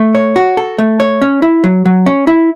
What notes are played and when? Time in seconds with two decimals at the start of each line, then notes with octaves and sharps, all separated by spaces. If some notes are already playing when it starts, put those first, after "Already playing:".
Already playing: A3
0.15 C#5
0.36 F#4
0.57 A4
0.78 A3
1.00 C#5
1.22 C#4
1.42 E4
1.64 F#3
1.85 F#3
2.06 C#4
2.27 E4